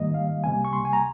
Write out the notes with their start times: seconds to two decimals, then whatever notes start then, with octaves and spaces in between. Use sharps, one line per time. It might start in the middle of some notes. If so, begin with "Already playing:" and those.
Already playing: G#2 D#3 G3 A#3 D#5
0.14 F5
0.43 C#2 C3 G3 A#3 G#5
0.65 C#6
0.73 C6
0.85 G#5
0.93 A#5